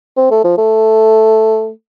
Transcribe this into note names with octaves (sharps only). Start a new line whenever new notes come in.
C4
A3
F3
A3